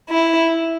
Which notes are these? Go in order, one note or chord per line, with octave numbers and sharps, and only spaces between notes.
E4